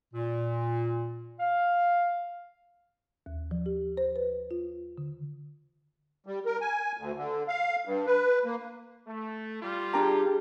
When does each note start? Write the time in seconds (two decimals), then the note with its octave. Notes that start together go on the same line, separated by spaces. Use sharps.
0.14 A#2
1.40 F5
3.26 D#2
3.51 F3
3.66 G4
3.97 C5
4.16 B4
4.51 F4
4.98 D3
6.26 G3
6.46 A#4
6.61 G#5
6.97 D2
7.16 D3
7.48 F5
7.85 G2
8.06 B4
8.45 A#3
9.07 A3
9.62 G3 F4
9.93 D4 G4 G#4 G5 A#5